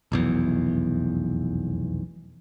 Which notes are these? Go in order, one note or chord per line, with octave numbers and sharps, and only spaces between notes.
F1 B1 E2